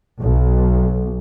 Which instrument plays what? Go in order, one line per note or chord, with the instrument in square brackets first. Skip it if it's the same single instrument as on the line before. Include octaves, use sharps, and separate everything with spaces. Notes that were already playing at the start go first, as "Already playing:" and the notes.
[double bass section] B1